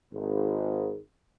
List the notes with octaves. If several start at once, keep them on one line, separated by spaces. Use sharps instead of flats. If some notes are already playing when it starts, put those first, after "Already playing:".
G#1